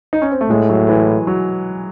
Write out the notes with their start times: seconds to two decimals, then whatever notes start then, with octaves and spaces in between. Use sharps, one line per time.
0.13 D#4
0.22 C#4
0.31 C4
0.41 A3
0.50 A2 G#3
0.69 F#3
0.88 E3
1.27 F#3